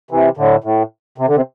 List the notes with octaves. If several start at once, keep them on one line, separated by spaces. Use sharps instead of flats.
C3 E3
A2 D3
A2
C3
D3
C3